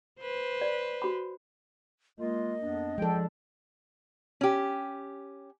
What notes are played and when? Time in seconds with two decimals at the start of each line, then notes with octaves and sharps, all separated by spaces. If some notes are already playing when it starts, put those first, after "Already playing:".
0.20 B4 C5
0.61 D5
1.02 F#4 B5
2.19 G#3 A#3 F4 D#5
2.61 F2 B3 D4
2.98 F3 G#3 D4 A4 G5
4.41 C#4 G4